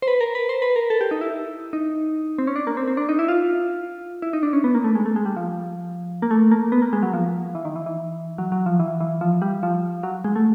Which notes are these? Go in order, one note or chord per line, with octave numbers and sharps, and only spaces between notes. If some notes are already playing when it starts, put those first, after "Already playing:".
C5
B4
A#4
B4
C5
B4
A#4
A4
G4
D#4
E4
D#4
C4
C#4
D4
A#3
C4
C4
D4
D#4
E4
F4
E4
D#4
D4
C#4
B3
A#3
A3
G#3
A3
G#3
G3
F3
A#3
A3
A#3
B3
A#3
G#3
F#3
F3
E3
D#3
E3
E3
F#3
F#3
F3
E3
E3
F3
G3
F3
F#3
G#3
A3